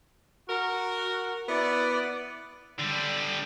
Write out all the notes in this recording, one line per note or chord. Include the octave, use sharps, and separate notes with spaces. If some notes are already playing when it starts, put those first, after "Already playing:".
F#4 A#4
B3 E4 D5
D3 G3